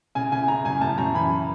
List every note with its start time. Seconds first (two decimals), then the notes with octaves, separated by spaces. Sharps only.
0.15 C#3 G#5
0.32 C#3 G#5
0.48 C#3 A#5
0.65 F#2 G#5
0.81 F#2 A5
0.98 F#2 A#5
1.15 E3 B5